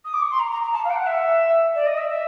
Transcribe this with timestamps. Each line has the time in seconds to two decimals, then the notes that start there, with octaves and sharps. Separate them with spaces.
0.04 D#6
0.13 D6
0.22 C#6
0.30 C6
0.39 A#5
0.50 A#5
0.62 A#5
0.72 A5
0.84 F5
0.90 G5
0.95 F#5
1.06 E5
1.74 D5
1.86 D#5
1.97 E5
2.09 E5